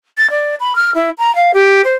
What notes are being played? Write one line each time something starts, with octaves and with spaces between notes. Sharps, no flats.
A6
D5
B5
F6
E4
A#5
F5
G4
C5